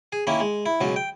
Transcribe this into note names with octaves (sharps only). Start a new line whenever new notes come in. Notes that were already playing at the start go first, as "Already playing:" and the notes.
G#4
D#3 A#3 C#4 E4
G#3
E4
C#2 B2 F#3 C#4
G5